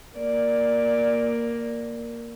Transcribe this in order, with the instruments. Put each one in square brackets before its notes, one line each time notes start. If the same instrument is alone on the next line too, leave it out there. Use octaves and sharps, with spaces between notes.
[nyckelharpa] A#3 [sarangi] D5